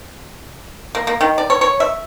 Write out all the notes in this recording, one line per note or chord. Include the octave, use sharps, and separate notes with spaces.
A#3
A#3
D#3
D5
C#5
C#5
E5